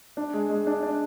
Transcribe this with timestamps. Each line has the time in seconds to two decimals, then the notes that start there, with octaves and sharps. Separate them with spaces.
0.17 D4
0.34 G#3
0.50 G#3
0.67 D4
0.83 D4